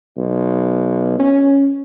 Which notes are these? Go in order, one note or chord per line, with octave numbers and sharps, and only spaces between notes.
B1
C#4